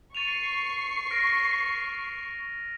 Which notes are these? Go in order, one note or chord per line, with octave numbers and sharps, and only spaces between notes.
C#6 A6 C7 D#7 F7
F6 A#6 D7